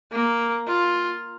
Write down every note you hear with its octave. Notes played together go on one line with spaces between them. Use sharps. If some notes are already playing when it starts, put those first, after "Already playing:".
A#3
F4